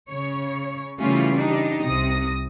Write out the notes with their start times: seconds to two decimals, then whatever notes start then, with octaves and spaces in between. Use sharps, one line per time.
0.11 C#3 C#5
1.00 C#3 E3 G3 A3 C#4 F4
1.36 D4 D#4 G4
1.84 C2 C3 D#6 A#6